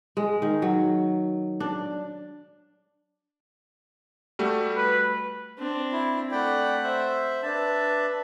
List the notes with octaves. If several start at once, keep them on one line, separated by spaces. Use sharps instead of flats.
G#3
D#3
F#3
D4
G3 A3 F#4
B4
C4 D4
E4
A3 D5 F#5 G5 B5
C5 E5
D4 B4 E5 A5